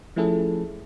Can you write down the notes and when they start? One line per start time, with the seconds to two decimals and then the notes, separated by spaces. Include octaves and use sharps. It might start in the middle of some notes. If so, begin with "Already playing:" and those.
0.16 F3 A3 C#4 E4 G#4 A4